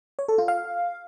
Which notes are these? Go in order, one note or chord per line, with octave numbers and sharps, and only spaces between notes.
C#5
A4
F4
F5